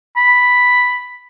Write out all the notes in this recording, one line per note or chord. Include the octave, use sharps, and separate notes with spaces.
B5